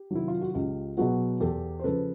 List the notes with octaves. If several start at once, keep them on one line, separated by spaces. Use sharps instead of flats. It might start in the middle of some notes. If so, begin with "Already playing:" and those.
Already playing: G4
C3 D#3 F#3 E4
F4
F#4
C#2 F4 G4
B2 F#3 B3 F#4 G#4
E2 G4 A4
C5
C#3 F3 A4 B4